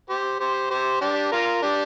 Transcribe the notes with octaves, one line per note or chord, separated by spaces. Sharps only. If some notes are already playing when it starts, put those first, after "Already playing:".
G4 C5
G4 C5
G4 C5
D4 G4
F4 A#4
D4 G4